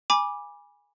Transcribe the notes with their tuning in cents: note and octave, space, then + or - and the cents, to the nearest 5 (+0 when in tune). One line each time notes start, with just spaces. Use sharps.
G#5 -15 B5 -25 D6 +0